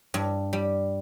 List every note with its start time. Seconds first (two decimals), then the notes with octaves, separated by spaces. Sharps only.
0.14 G2
0.53 G3